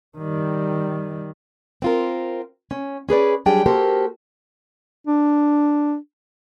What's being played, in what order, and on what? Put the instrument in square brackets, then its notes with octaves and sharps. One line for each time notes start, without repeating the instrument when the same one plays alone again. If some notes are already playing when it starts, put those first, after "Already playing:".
[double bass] D#3 G3
[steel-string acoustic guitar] C4 F4 A#4
C#4
C#4 G#4 B4 D5
F#3 G3 D4 G4 G#4 G5
A#3 F#4 G4 A4 A#4 C5
[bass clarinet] D4